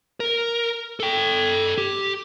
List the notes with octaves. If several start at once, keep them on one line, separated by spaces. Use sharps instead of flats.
A#4
A4 G5
G4